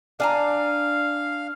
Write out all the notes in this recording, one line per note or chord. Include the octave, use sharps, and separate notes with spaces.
D4 F5 G#5 A#5